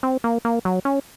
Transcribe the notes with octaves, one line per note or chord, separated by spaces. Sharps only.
C4
A#3
A#3
F#3
C#4